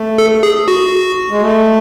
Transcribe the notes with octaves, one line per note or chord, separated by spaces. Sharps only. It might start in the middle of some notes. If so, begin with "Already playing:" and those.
Already playing: A3
A4
G#4
F#4
G#3
A3